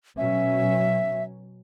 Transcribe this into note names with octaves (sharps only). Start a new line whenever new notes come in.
B2 F#3 C#4 E5